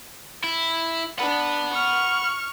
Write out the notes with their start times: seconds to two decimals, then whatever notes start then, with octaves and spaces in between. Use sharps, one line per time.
0.44 E4
1.19 D4 F#5 B5
1.73 C#6 F6